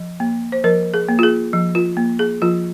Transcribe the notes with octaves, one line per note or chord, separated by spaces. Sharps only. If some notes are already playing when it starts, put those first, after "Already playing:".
Already playing: F3
A#3
C5
F3 A#4
G#4
A#3
F4
G#4
F3
F4
A#3
G#4
F3 F4